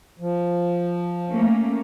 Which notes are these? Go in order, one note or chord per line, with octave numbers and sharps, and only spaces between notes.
F3
A3 A#3 C#4